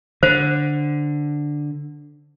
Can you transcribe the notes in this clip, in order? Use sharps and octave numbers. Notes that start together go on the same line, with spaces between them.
D3 C5